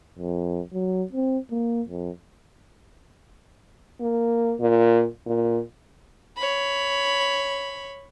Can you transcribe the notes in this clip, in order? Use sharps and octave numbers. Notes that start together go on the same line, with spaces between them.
F2
F#3
C4
A#3
F2
A#3
A#2
A#2
C#5 B5